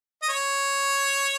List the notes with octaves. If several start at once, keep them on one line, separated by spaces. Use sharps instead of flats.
D#5
C#5